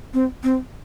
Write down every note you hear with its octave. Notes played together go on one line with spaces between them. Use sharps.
C4
C4